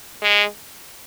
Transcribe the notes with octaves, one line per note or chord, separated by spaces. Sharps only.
G#3